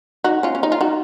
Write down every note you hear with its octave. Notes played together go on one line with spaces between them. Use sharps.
D#4 F#4
C#4 F4
C#4
D#4
F4
D#4 F#4